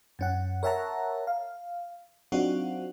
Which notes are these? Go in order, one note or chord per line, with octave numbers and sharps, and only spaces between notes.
F#2 C#4 F#5
A#4 C#5 E5 F#5 A5 A#5
F5
F#3 C4 D4 D#4 F4 F#4